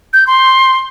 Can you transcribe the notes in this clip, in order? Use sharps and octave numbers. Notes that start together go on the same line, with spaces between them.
G6
C6